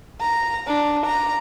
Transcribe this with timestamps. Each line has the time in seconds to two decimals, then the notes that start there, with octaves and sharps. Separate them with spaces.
0.20 A#5
0.67 D4
1.06 A#5